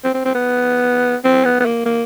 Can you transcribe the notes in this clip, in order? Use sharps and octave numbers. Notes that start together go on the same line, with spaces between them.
C4
C4
C4
B3
C4
B3
B3
A#3
A#3